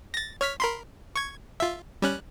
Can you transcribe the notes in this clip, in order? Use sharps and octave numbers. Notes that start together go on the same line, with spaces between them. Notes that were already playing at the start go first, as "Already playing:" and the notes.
A6 A#6
C#5 F6 B6
A#4 B5 C6
C#6 G#6
F4 E5
G3 C#4 F#6